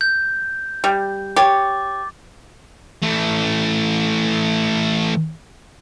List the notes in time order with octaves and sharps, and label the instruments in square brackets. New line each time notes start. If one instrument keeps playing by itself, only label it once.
[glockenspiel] G6
[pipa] G3
[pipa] G4 C#5 [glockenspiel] D6 A6
[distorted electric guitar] E3 A3